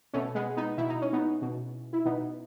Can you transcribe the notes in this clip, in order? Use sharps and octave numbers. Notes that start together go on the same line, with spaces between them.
B2 A3 C#4
G#3 B3
B3 D#4
B2 E4
D#4
C#4
B3 D#4
B2
E4
B2 B3 D#4